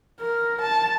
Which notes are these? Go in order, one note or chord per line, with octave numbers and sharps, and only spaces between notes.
A#4
A5